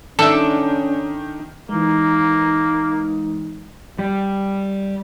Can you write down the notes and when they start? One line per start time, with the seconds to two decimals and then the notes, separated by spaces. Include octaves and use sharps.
0.19 D#3 C#4 D4 A4 E5
1.69 E3 G#3 A#3 D#4
3.99 G3